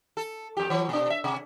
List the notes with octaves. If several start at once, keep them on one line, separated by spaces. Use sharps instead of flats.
A4
F2 G4
E3 F#3 C#5
B2 D4
E5
C3